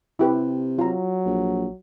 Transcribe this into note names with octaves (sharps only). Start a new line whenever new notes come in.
C3 E4 G4 B4
F#3 F4 A#5
A#1